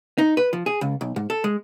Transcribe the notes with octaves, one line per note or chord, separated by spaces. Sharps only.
D#4
B4
F3
G#4
C#2
B1
G#2
A4
G#3